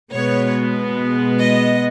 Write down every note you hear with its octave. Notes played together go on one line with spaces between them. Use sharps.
B2 G#3 B3 C#5
D#5